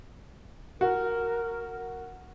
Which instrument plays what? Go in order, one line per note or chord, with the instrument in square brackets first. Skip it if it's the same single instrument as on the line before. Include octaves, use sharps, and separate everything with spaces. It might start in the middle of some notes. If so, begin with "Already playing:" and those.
[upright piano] F#4 [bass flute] A#4